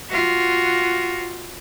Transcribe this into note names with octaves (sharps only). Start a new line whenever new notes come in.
F4 F#4